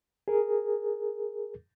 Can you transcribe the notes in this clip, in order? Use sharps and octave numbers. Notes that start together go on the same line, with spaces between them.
G#4 A#4